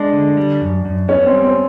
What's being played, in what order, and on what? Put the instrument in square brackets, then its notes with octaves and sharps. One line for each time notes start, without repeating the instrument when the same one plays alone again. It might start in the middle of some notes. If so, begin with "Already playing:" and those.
Already playing: [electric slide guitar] G#3 [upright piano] D4
[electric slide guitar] D3
G3
F#2
F#2
[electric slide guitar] B3 [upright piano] C#4
[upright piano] C4
[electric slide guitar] G3
[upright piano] C4